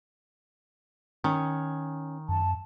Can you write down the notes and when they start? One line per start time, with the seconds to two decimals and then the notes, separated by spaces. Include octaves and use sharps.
1.24 D#3 C#4
2.29 F#2 A5